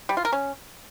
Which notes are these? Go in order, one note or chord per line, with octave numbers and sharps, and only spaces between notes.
G3
F4
A#4
C#4